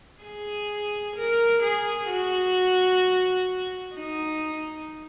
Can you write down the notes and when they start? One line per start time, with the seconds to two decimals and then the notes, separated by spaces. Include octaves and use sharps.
0.22 G#4
1.16 A#4
1.62 G#4
2.09 F#4
3.95 D#4